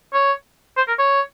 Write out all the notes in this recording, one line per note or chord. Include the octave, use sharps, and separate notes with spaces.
C#5
C5
A#4
C#5